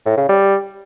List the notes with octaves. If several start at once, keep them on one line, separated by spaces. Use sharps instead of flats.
A2
C#3
G3